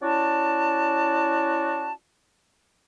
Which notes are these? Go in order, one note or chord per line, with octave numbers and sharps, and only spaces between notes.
C#4 E4 F#4 D5 A5